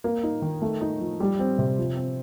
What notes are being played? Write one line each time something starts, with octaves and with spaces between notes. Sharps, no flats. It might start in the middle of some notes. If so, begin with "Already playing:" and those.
A#3
D#4
D#3
A3
D#4
F3
G3
C4
C3
F3
C4